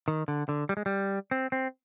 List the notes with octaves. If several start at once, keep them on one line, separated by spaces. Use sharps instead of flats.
D#3
D3
D3
G3
G#3
G3
C4
C4